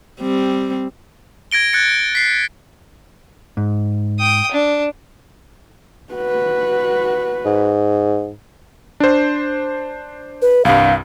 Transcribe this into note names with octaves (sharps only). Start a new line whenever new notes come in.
G3 C4
G#6 A#6 D7 G7
F#6 G#6 A6 C#7
B6 C7
G#2
G5 D#6
D4
F#4 B4
G#2
D4 C5
B4
C2 G2 F5